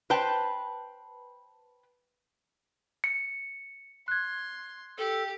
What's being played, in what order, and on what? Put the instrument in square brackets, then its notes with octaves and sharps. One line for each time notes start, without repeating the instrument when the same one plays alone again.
[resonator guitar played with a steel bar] B4 C5 G5 A5
[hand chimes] C#7
[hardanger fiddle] C6 [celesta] F#6 G#6
[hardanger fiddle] G4 [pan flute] A4